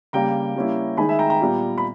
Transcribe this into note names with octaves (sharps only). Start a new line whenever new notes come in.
C#3 G3 A#3 G5 A#5
G3 A#3 C#4 E4
D#3 G#3 D#4 G#5 B5
E5 G#5
G5 A#5
G5 A#5
A#2 G3 B3
B5